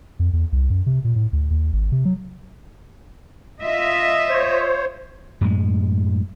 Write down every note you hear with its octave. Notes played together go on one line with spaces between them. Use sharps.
F2
E2
C2
F#2
C3
A#2
A2
D2
D#2
G#1
C3
F#3
F4 D#5 E5
C5 C#5
F#2 A2 G#3